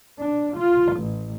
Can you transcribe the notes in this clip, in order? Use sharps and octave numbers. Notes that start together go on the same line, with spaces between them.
D4
F4
A1